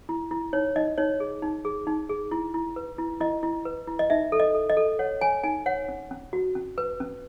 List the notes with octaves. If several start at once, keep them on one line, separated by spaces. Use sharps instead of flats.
E4
E4
D#4 C#5
D#4 D#5
D#4 C#5
G#4
D#4
G#4
D#4
G#4
E4
E4
B4
E4
E4 D#5
E4
B4
E4
D#5
D#4 E5
A4
D#5
A4
D#5
A4
C#5 F#5
C#5 G#5
D#4 G#5
C#5 F#5
C#4
C#4
F#4
C#4
B4
C#4